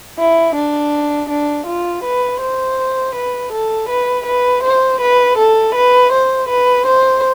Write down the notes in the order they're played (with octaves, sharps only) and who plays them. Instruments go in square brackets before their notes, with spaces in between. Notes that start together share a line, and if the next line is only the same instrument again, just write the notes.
[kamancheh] E4
D4
D4
F4
B4
C5
B4
A4
B4
B4
C5
B4
A4
B4
C5
B4
C5